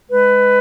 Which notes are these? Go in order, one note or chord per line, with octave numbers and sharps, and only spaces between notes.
G#3 B4